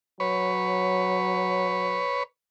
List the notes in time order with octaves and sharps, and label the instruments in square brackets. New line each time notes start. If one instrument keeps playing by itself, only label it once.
[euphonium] F#3 [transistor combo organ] B4 C#5